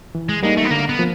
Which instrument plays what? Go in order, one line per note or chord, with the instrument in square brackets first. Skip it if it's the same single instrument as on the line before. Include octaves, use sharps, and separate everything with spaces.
[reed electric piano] E3
[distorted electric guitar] G#3
[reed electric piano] G3 A#3 D#4 [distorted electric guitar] G#3
[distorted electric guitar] A3
B3
[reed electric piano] D3 [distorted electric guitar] A#3
[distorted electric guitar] B3
[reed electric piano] F3 A#3